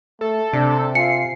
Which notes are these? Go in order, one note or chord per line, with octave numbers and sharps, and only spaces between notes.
A3 A4
C3 D4
F4 G#5 C7 C#7